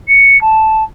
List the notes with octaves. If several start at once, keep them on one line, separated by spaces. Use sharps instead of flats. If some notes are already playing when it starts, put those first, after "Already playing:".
C#7
A5